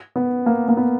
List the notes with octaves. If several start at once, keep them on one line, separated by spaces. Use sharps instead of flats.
B3
A#3
A#3
B3